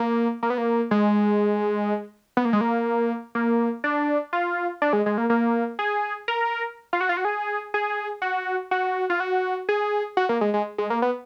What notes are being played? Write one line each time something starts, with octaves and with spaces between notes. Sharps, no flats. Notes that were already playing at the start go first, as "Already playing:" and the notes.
Already playing: A#3
A#3
B3
A#3
G#3
B3
A#3
G#3
A#3
A#3
D4
F4
D4
G#3
G#3
A#3
A#3
G#4
A#4
F4
F#4
F4
F#4
G#4
G#4
F#4
F#4
F4
F#4
G#4
F#4
A#3
G#3
G#3
G#3
A#3
B3